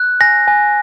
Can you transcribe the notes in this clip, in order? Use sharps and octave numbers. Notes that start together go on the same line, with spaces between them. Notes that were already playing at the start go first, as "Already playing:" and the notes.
Already playing: F#6
G#5 A#6
G#5